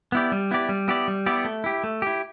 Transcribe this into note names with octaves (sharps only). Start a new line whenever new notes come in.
B3 E4 G4 D5
G3
B3 E4 G4 D5
G3
B3 E4 G4 D5
G3
B3 E4 G4 D5
A3
E4 G4
A3
E4 G4